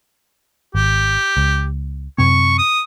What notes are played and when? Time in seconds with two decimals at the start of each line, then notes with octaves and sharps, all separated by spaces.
0.75 G#1 G4
1.37 C#2
2.18 F#2 C3 C4 C#6
2.58 D#6